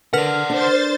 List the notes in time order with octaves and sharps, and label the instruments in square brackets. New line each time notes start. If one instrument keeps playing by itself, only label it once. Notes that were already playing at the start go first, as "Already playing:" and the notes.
[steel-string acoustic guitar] D3 [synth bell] A#4 B4 F6 [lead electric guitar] D5 F#5
[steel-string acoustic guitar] D4 [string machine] C5 A6